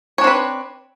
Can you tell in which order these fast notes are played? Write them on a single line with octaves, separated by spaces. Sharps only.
C#5 D4 C4 B4